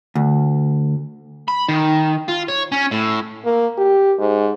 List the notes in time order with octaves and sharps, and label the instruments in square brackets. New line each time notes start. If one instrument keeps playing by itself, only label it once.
[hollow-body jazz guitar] D2
[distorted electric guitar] B5
D#3
F4
C#5
C#4
A2
[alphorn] A#3
G4
G#2